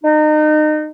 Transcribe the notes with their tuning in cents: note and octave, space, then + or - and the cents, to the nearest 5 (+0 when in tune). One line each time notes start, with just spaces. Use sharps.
D#4 -30